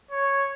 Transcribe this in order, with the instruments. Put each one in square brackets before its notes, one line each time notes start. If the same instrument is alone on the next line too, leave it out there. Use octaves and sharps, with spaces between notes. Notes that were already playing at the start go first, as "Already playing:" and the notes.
[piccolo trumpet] C#5